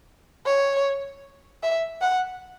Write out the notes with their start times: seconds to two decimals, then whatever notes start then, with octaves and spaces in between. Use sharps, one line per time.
0.46 C#5
1.63 E5
2.02 F#5